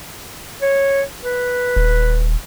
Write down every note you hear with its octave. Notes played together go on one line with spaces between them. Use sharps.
C#5
B4
D#1